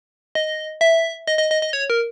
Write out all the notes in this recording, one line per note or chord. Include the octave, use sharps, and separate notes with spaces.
D#5
E5
D#5
D#5
D#5
D#5
C#5
A#4